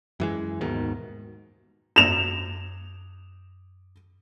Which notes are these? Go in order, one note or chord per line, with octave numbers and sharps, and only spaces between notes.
F#2 E3 G#3
D#2 G#2 B2 D#3
F#2 E7 F7